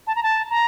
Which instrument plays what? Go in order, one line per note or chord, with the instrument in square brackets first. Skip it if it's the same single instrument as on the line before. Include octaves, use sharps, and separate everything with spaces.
[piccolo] A5
A#5
A5
A#5